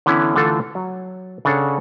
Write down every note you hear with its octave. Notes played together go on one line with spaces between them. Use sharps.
D3 E3 B3 C#4 E4
D3 E3 A3 F4 A4
F#3
C#3 D4 A4 C#5 F#5